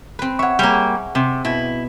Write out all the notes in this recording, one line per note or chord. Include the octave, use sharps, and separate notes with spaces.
C4 B4
C#5 E5 F#5 C#6
G3 A#3 G#4 C#5
C3 C4
B2 E4